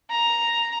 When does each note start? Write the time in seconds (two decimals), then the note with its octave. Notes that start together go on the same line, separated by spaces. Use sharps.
0.10 A#5